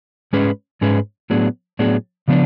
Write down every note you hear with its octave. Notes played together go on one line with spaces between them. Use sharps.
G#2 G#3 C#4 G#4 B4
G#2 G#3 C#4 G#4 B4
A2 F#3 B3 D4 G#4
A2 F#3 B3 D4 G#4
C#3 F3 B3 D4